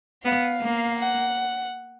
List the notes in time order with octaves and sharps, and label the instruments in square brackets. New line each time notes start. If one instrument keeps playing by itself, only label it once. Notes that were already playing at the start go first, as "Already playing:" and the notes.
[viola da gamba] B3 [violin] F5
[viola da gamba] A#3
[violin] F#5